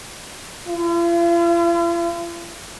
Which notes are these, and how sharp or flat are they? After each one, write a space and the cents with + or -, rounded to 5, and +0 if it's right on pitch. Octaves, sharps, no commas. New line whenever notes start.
F4 -45